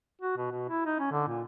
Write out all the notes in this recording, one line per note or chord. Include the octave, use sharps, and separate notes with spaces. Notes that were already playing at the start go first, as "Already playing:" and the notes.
F#4
B2
B2
E4
D#4
C#4
D3
A#2